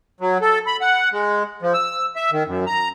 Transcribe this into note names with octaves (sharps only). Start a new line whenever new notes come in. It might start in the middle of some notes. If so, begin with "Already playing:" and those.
F#3
A4
B5
F#5
G#3
F3
E6
E5
D#3
F#2
A#5